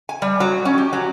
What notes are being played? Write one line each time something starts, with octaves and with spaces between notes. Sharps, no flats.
G#5
G3
F#3
C#4
G4
F#3